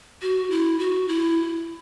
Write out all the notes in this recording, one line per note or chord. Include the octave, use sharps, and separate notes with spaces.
F#4
E4
F#4
E4